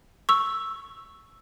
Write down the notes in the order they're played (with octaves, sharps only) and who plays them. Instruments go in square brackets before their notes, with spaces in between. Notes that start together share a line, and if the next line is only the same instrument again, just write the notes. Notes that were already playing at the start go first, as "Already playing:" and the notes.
[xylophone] C#6 E6